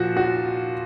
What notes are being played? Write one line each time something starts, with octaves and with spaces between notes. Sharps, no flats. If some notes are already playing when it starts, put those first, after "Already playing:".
Already playing: A#2 F3 F#4
F#4